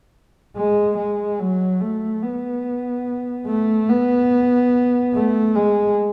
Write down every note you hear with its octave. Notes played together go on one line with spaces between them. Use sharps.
G#3
G#3
F#3
A3
B3
A3
B3
A3
G#3